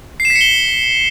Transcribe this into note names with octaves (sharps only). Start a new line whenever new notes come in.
C7
E7
B6
C#7
G7